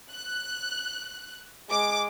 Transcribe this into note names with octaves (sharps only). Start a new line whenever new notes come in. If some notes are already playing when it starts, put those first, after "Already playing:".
F#6
G#3 D6